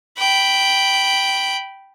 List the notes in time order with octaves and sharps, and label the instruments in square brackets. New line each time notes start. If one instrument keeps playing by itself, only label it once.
[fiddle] G5 B5